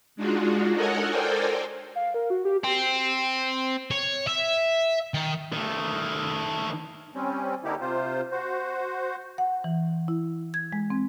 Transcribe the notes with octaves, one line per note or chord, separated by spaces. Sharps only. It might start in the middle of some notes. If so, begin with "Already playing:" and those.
G#3 D4 D#4 F4 F#4
A4 A#4 C#5 D#5 F#5 G#5
A4 A#4 C5 D5 G5 G#5
F5
A#4
F#4
G4
C4
C#5
E5
D#3
D#3 A3
G3 C4 C#4
D3 A#3 D#4 E4 G4
C3 F4 C5
F#4 C5
F#5
E3
E4
G#6
G#3
C4